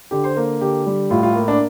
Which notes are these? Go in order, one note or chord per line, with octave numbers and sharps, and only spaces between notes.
D3 G4
C5
A#3
D3 G4
G3
A2 F4
F4
A#3
D4